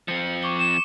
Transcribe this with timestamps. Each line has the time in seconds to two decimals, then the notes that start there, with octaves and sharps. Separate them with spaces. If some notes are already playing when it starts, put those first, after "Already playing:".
0.08 F3 C4 C#7
0.43 C#6 D6 G7
0.59 E7